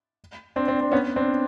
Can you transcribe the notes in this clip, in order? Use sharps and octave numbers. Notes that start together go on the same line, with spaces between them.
C4 D4
C4 D4
C4 D4
B3 C#4
C4 D4